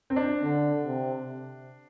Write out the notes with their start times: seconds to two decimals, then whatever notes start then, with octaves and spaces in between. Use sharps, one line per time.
0.10 C4
0.16 D4
0.43 D3
0.83 C3